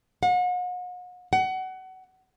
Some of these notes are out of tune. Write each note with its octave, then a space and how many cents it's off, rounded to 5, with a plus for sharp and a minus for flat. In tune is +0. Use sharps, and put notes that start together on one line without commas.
F#5 -40
F#5 +25